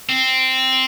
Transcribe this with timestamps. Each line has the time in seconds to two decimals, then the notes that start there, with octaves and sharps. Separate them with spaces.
0.09 C4